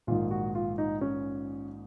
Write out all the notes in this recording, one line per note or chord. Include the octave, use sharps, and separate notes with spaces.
A#1 G#2 D#3 F4
F#4
F4
D#4
C#4